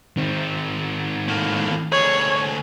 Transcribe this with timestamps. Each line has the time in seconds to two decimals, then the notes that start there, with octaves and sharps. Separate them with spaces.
0.17 D#3 C4
1.28 A2 A#3
1.92 D2 G#4 C#5